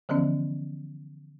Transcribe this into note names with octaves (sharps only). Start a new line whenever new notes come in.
D3 E3 F3 B3 C#4